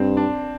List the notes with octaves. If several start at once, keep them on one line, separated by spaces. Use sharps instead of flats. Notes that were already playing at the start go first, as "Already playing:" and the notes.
Already playing: G2 C4
D4